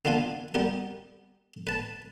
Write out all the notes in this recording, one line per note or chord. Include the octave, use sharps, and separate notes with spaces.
A#3 B3 D4 F4 F5 G#5
G3 B3 G4 A#4
B4 A5